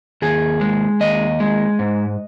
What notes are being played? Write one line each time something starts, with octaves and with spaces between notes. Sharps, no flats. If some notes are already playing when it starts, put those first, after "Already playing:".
D#2 G#4
G#3
D#2 D#5
G#3
G#2